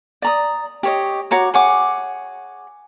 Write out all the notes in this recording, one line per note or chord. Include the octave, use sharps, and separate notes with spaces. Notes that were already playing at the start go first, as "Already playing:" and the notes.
D5 A#5 D#6
G4 C#5 D#5
F#4 C#5 A#5 D6
G#4 C#5 F#5 D6